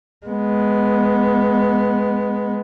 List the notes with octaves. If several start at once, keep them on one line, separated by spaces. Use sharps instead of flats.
G#3 B3